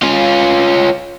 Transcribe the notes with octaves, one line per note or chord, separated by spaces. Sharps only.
C#4 F4